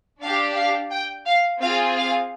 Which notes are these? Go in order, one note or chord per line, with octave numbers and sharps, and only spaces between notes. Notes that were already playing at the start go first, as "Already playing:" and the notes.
D4 G4 F5
F5
G5
F5
C4 F4 G#4 F5
F5